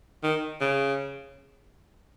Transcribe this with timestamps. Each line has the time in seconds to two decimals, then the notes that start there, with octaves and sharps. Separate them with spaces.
0.24 D#3
0.61 C#3